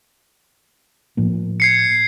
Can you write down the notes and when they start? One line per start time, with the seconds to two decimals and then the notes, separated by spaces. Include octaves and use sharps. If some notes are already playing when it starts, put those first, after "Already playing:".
1.17 A2 F3 A#3
1.60 G#6 C7 C#7